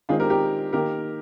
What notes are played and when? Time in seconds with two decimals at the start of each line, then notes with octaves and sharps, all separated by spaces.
0.09 D#3 G#3 C4 F4 G#4
0.20 G4 A#4
0.30 G4 A#4
0.73 D#3 A#3 G4 A#4